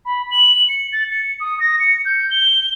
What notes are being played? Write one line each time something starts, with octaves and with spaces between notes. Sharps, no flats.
B5
F#7
F#7
C#7
A6
C#7
D#6
A#6
C#7
G6
G7